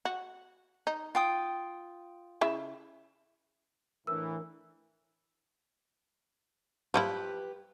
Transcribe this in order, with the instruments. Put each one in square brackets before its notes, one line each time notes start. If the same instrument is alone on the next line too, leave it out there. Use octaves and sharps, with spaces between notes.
[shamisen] F#4
D#4
[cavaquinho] F4 G5 D#6
[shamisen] C#3 E4 E5
[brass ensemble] A2 E3 [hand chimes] D4 A#4 [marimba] E6
[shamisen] F3 G3 E4 [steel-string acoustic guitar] G4 B4